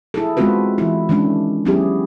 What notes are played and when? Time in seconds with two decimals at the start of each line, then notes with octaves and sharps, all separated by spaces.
0.14 E4 G#4 A4
0.37 G#3 B3 C4 F4 F#4 B4
0.78 E3 E4
1.09 D#3 G#3 C#4 D4
1.65 F#3 B3 C#4 E4 G4 G#4